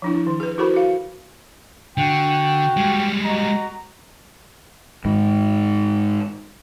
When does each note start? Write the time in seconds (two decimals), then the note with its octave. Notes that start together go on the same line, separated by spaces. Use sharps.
0.02 F3 D4 E4
0.13 E4
0.27 D#3
0.40 G#4 B4
0.58 E4 F#4 A4 A#4 C5 B5
0.74 F#4 F5
1.98 D3 F#4 G5
2.77 G3 G#3
3.25 F#4 D#5 A#5
5.05 G#2 D#3